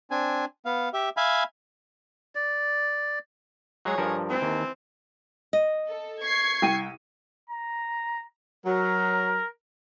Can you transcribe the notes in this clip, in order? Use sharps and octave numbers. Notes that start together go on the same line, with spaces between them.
C4 D4 G#5
B3 F5
G4 E5
E5 F5 G#5 B5
D5
F#3 G#3 G#4 C#5
G2 F3 A#4
E3 C4
D#2
D#5
A4
C#6 G#6 C7
C2 G5 D#7
A#5
F#3 A#4